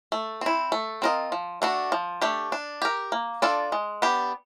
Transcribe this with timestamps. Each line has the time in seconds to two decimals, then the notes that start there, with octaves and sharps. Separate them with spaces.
0.12 A3
0.41 C4 E4
0.72 A3
1.02 C4 F4 A#4 D#5
1.32 F3
1.62 A3 D4 F#4
1.92 F3
2.22 A3 D4 G4
2.52 D4
2.82 G4 A#4
3.12 A#3
3.42 D4 F4 A4 D5
3.72 G#3
4.02 B3 D4 G4